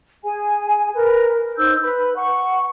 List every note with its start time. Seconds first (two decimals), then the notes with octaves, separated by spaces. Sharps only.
0.24 G#4 G#5
0.95 A#4 B4
1.57 D#4 C5 E6 G6
1.82 B4 B5
2.16 F#5 C#6